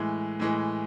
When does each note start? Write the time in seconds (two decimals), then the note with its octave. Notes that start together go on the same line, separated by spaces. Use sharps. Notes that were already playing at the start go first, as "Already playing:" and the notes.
Already playing: A2 E3 G#3
0.40 A2 E3 G#3